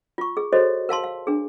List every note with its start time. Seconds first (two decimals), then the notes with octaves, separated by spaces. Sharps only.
0.18 F4 C#6
0.37 G#4
0.53 F#4 A4 C5 C#5 D#5
0.89 A#4 F5 A5 C6
1.04 F5
1.27 D4 G#4